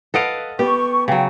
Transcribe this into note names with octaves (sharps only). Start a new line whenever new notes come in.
A4 B4 D#5 F5 F#5 D7
B3 G4 C#6
C#3 F#3 G5